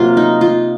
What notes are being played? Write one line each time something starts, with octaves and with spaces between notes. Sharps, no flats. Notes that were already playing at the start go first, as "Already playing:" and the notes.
Already playing: C3 F#3 A#3 F4
D#4
F4